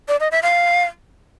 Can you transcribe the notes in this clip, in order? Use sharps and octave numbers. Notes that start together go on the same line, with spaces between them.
D5
D#5
E5
F5